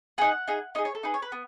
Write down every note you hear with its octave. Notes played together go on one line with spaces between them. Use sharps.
D#4 G#4 F#5
D#4 G#4
D#4 G#4 D#5
C#5
A4
D#4 G#4 B4
C#5
B4
B3